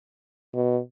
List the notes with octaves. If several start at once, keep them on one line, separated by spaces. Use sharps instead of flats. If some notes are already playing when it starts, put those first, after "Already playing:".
B2